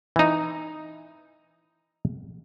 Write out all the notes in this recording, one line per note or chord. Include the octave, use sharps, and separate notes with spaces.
E3 D#4